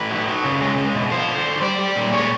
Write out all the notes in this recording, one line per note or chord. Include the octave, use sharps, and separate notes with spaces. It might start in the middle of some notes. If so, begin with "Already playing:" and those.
Already playing: A2 B4
F#3
F#3
C#3
G#3
G#3
B2
F3 C5
D3
D3
G3 D5
G3
A#2
G#3 C#5